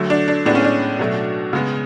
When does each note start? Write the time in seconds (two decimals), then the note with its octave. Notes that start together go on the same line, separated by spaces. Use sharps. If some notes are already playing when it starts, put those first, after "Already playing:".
Already playing: D3 F#3 A3
0.10 D4
0.28 D4
0.45 A2 G#3 B3 D4
0.55 C#4
0.64 D4
0.99 B2 F#3 A3
1.53 C#3 G#3 B3